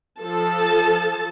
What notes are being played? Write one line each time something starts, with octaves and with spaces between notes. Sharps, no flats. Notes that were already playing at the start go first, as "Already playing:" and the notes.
F3 A4 A5